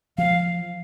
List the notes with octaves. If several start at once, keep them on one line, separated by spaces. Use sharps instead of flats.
F3 F5